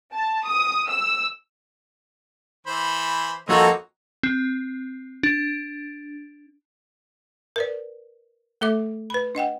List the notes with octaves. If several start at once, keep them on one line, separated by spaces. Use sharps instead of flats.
A5
D#6
E6
E3 C5 B5
F2 A#3 D#4 F#4 A4 C5 C#5
C4
D4
A#4 B4 D5
A3 A4 E5 D6
B4 B5
D4 D#5 F#5 G5